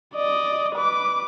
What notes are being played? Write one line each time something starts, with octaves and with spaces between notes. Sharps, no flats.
D5 D#5
B4 D6